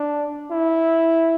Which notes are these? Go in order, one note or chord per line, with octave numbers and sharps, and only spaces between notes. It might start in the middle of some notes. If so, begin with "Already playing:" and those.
Already playing: D4
E4